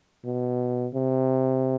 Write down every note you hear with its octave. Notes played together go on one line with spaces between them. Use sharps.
B2
C3